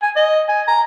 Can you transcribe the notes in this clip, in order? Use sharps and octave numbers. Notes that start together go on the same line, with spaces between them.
G#5
D#5
G#5
A#5